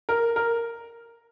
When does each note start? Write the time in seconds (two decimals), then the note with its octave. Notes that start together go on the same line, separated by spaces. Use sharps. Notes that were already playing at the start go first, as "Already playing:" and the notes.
0.09 A#4
0.36 A#4